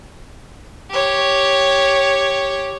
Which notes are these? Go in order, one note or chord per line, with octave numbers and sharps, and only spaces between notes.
G4 C#5